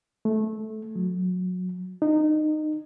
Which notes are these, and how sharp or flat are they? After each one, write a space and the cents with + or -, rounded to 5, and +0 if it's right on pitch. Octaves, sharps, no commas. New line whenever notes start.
A3 -15
F#3 -25
D#4 -20